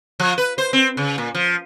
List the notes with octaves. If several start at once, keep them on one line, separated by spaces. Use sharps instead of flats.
F3
B4
C5
C4
C#3
A#2
F3